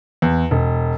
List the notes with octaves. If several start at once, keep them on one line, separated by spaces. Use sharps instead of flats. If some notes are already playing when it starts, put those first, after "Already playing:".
E2
E1